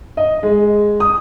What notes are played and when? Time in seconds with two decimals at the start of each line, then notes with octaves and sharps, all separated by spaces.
0.17 D#5
0.43 G#3
1.00 D#6